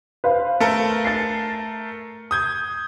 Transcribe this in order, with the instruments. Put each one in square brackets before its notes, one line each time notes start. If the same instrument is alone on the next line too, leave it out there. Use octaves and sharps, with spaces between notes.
[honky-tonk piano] B4 C5 F5
[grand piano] A3 A4 A#4
[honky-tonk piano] A6 C7
[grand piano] D#6 G6 G#6